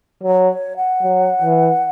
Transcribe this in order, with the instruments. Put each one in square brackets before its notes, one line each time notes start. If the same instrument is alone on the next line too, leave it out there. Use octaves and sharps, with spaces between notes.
[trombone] F#3
[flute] C#5
F#5
[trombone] F#3
E3